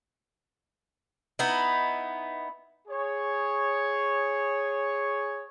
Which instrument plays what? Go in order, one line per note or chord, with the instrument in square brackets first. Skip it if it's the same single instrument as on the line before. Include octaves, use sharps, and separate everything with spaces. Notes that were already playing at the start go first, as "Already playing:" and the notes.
[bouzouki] B3 D#4 E4
[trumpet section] G#4 C#5